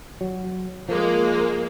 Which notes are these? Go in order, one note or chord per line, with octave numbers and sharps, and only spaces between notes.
F#3
F3 G#3 A#3